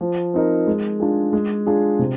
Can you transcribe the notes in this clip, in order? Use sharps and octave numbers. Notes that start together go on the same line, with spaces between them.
F3
C4 D#4 A#4
G#3
D4 F4 G#4
G#3
D4 F4 G#4
C3